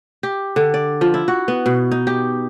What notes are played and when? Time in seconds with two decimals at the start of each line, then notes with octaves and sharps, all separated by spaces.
0.23 G4
0.56 D3
0.74 D5
1.01 F3
1.14 E4
1.28 F#4
1.48 B3
1.66 B2
1.91 D#4
2.07 G4